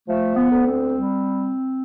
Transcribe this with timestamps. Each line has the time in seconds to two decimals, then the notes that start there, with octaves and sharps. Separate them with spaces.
0.08 F3 A3
0.36 B3
0.51 D2
0.66 C4
0.93 G3